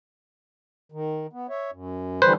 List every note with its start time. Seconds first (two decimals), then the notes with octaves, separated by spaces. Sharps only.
0.92 D#3
1.33 B3
1.49 C#5 E5
1.72 F#2
2.22 D3 E3 G3 B4 C5